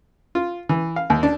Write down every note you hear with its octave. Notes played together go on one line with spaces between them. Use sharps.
F4
E3
F5
D#2
D4